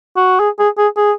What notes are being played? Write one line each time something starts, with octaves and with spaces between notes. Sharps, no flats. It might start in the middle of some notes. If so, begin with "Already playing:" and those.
F#4
G#4
G#4
G#4
G#4